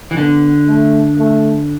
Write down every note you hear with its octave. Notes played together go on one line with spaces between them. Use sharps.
E3
D3 B3
A3
A3